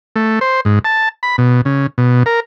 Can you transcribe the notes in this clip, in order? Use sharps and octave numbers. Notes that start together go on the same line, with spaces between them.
A3
C5
G#2
A5
B5
B2
C#3
B2
A#4